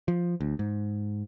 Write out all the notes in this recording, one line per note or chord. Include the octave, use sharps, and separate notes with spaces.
F3
D2
G#2